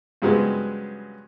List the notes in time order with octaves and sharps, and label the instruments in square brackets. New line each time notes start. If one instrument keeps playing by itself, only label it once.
[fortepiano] G2 C#3 F#3 G#3 B3 C4